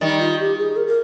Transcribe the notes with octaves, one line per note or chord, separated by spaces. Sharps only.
D#3 G3 D#4
F4
G4
G#4
A#4
A#4